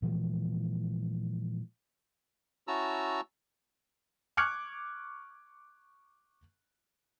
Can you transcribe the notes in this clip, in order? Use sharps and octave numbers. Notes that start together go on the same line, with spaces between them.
A#2 E3 F3 G#3
C#4 E4 F#4 A5 A#5 E6
C#6 D6 F6 F#6 G#6 C#7